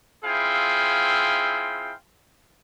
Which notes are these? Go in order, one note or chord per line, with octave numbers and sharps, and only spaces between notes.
C4 E4 F4 G#4 F5 G5